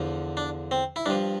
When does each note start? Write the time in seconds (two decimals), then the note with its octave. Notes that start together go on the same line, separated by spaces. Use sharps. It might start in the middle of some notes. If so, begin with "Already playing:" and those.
Already playing: E2 D3 F3
0.37 D4
0.71 C4
0.96 E4
1.06 G2 F3 D4